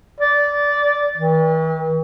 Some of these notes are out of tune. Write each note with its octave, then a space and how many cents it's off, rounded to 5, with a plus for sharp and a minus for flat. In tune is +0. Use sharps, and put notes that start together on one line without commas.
D5 -15
E3 -45